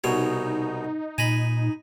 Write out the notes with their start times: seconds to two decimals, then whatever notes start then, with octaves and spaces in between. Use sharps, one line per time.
0.04 C2 B2 D#4 C#5
1.18 A#2 G#5 A#5 B5